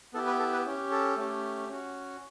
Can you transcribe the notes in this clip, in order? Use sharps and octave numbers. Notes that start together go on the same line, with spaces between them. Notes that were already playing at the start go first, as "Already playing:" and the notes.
B3 E4 G4 A4
B4
A4
B4
C#4 G4
A4
A3 C#4 G4
C#4 F#4